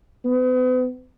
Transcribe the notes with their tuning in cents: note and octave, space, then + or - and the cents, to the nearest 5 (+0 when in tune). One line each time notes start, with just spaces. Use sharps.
B3 +45